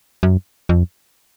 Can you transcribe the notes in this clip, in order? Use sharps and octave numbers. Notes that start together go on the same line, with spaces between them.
F#2
F2